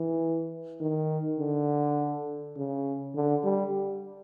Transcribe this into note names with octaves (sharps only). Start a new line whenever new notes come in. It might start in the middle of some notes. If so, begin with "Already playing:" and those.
Already playing: E3
D#3
D3
C#3
D3
G3